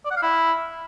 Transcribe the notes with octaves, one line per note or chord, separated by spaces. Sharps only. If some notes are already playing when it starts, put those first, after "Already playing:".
D5
F#5
F5
E4